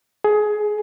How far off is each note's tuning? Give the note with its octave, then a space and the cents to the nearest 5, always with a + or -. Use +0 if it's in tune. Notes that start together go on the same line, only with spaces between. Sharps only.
G#4 +20